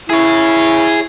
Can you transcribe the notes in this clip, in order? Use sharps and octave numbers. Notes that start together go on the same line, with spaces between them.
E4 G#4 C#5